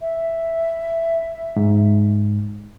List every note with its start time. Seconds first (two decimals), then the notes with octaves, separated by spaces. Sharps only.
0.01 E5
1.56 G#2